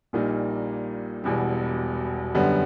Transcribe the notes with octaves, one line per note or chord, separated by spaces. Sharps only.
A#1 A#2 G3 A#3 D#4
E1 E2 B2 G3
F#2 D3 G3 B3